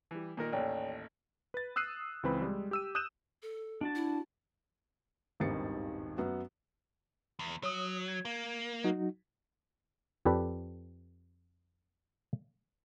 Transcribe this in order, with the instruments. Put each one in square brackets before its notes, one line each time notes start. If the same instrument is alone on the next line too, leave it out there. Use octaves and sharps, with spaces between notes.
[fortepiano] E3 G3
A#2 D#3 A#4
[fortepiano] A1 D#2 [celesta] C#5 D5 G5
[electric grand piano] B4 A6
D#6 E6 F#6 C7 D#7
C#2 E3 C4 B4 B5
G3 G#3
G4 E6 D#7
D#6 F#6 G6 D#7 E7
[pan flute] A4
[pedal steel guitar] D4 F#4 A5
[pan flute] E4
[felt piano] D#1 G#1 G2 D#3 A6 C#7
F#2 B3 F#4
[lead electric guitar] E2
[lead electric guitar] F#3 [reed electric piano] C#5 D#6
[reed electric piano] G#6
[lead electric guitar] A#3
[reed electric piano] F#3 D#4 F#4
[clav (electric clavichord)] F2 G4 A4 B4 D5